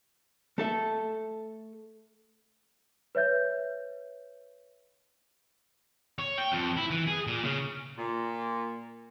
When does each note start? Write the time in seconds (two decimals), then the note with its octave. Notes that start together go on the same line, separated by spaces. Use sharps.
0.58 A3 A4 E5
3.15 B4 C#5 E5 G6
6.19 C#5
6.38 G5
6.52 F2
6.77 E4
6.91 E3
7.07 G#4
7.27 A#2
7.45 C#3
7.97 A#2